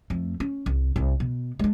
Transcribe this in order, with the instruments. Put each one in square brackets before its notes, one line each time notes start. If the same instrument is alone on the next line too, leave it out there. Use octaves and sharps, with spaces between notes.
[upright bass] F2 A3
C#4
C2
C2
B2
G#3 D4